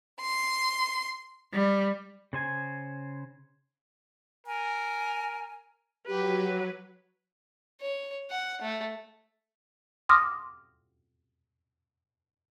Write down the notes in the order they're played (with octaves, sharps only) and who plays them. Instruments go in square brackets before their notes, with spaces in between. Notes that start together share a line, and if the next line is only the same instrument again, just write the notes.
[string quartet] C6
G3
[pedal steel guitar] C#3 C5 G#5
[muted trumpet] A#4 [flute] G#5
[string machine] F#3 [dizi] G4 [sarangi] B4
[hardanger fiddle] C#5
F#5
A3
[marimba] C6 D6 D#6 F6 A#6